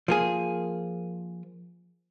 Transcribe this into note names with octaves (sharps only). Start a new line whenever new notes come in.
F3 A#3 G#4